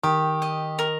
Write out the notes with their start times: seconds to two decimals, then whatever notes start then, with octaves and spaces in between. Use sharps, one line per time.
0.03 D#3 G4
0.42 D#5
0.79 A#4